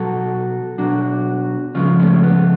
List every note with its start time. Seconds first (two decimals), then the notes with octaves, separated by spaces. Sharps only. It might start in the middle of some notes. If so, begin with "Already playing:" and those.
Already playing: B2 F#3 F#4 A4
0.78 B2 F#3 D4 F#4
1.75 C#3 F3 G#3 C#4 F4
1.99 A3 C#4
2.23 B3